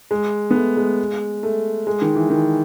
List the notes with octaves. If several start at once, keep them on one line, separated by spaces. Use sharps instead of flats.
G#3
B3
A3
G#3
A3
G#3
D#3
E3
D#3